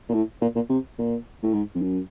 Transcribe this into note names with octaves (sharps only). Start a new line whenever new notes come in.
A#2
A2
A#2
A#2
C3
A#2
A2
G#2
F2
F#2